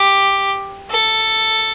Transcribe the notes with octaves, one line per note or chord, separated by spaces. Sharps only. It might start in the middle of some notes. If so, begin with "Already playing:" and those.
Already playing: G4
A4